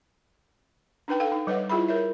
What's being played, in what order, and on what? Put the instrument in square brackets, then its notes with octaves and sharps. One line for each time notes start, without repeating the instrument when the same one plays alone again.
[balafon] D4 D#4 B4 G5
A4 F5 G5
D#4
G3 B4 C#5 D#5 E5 F#5
E4 F4 G#4 E5 B5
A#4 C#5 E5